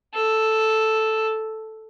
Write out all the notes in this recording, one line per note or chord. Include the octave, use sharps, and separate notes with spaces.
A4